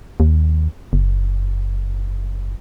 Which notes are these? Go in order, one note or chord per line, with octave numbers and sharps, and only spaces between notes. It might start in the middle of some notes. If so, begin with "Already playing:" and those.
D#2
F#1